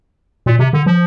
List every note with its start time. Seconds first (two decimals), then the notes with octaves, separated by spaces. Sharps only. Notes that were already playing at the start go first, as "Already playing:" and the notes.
0.46 A#2
0.59 C3
0.73 D3
0.86 F3